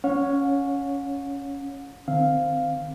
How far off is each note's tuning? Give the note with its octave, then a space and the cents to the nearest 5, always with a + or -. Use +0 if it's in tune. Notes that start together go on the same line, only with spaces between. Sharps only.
C#4 +5 C#5 +0 F#5 -45
D#3 -40 C4 -5 F5 +0